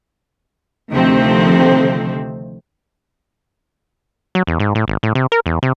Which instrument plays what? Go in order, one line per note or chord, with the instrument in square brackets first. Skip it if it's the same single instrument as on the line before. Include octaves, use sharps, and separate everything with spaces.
[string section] D2 C3 D#3 F3 A3 C4
[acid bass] F#3
E2
G#2
A2
G#1
A2
C3
A#4
E2
C3